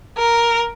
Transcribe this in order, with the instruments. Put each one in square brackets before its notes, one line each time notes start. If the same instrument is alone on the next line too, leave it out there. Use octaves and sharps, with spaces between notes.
[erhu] A#4